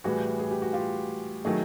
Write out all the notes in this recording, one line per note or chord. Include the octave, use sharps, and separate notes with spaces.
A2 E3 G3 F#4 G#4
G#4
G4
F#4
F4 G4
D#3 F#3 A3 F#4 G#4